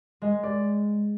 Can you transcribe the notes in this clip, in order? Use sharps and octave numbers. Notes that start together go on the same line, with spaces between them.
G#3 D#5
D5